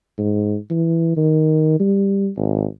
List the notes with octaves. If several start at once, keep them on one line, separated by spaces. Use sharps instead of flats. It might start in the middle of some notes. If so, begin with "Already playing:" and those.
G#2
E3
D#3
G3
G#1